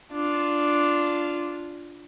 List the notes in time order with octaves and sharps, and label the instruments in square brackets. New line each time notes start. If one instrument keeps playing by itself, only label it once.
[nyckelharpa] D4 F4